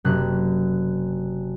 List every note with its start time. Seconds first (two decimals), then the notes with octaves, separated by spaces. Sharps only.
0.05 F#1 C3 F#6